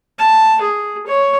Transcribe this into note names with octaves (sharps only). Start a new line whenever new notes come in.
A5
G#4
C#5